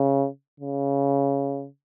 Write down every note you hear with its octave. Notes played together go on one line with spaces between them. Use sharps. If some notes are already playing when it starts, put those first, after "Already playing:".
Already playing: C#3
C#3